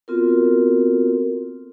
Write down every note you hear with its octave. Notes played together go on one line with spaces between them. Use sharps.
B3 C4 F4 F#4 A4 A#4